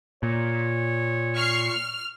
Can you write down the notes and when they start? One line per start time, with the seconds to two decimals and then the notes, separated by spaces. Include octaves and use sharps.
0.23 A#2 C#5
1.35 C#6 F6 C7
1.68 F6